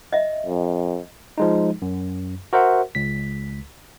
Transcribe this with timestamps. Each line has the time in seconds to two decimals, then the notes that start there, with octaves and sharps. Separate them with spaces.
0.13 D#5 E5
0.46 F2
1.38 F3 G#3 D#4
1.82 F#2
2.53 F#4 A#4 C5 E5 F#5
2.95 C#2 B6